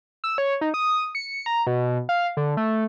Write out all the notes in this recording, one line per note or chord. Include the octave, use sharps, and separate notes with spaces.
E6
C#5
D#4
D#6
C#7
A#5
B2
F5
D3
A3